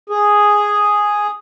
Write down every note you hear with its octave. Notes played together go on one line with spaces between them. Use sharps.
G#4